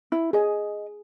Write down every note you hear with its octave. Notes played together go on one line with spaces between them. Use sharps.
E4
G#4 D#5